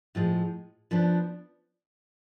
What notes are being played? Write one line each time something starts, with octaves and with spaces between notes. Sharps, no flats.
A2 F3 G#3
F3 B3 D4